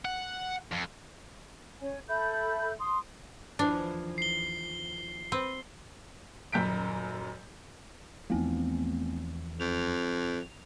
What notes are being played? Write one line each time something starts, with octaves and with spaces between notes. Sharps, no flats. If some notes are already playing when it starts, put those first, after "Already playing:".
F#5
F2
C#4 C#5 G#5
A4 E5 B5 G6
C6 D#6
D#2 E3 F3 D4
C7 G7
C4 B4
D#1 F#2 G6 B6 D7
E2 F3 A3 B3 C4
F2 F7